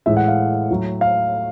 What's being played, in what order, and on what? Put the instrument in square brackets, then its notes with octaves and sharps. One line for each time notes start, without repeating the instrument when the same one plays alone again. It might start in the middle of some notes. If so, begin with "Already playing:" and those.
[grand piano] A2 E3 G#3 E5
F#5
F5
A2 F#3
F5